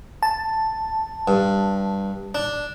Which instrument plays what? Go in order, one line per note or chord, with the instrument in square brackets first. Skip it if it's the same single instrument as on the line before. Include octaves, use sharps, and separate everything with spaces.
[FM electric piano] A5
[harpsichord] G2
D4